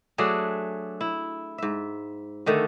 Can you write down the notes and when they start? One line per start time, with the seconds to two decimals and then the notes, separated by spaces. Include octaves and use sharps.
0.18 F#3 A3 D4 G#4
1.01 E4
1.58 G#2 E5
2.46 D3 D#3 A3